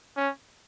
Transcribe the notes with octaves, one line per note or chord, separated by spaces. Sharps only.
C#4